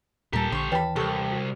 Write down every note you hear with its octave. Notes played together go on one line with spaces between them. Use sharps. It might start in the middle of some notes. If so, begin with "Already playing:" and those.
D#2 A#2 G3 G4 A4 A#4 A5
A#1 D3 C5 C#6
D#2 E3 B4 C#5 G5 A5 B5
C2 G4 A4 A#4 G5 C#6
F#4